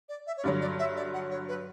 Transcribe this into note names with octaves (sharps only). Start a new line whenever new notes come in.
D5
E5
C#5
G2 D3 F#3 D5
D5
E5
D5
F#5
C#5
B4